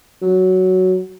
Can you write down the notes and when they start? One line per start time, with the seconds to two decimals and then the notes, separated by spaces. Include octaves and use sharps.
0.22 F#3